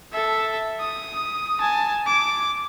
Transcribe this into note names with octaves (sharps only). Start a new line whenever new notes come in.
A4 E5
D#6
G#5 A5
D6